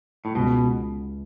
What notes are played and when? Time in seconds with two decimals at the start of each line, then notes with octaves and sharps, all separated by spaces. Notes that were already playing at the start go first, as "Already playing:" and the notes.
0.25 A2
0.35 C#2 B2